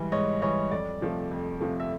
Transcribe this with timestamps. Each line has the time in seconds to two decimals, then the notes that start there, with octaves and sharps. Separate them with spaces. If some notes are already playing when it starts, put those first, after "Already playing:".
Already playing: G#2 E3 G3
0.12 G#2 C#5 D#5
0.42 E3 G3 C#5 D#5
0.71 F2 D5
1.01 C3 F3 A3
1.31 F2
1.61 C3 F3 A3
1.80 E5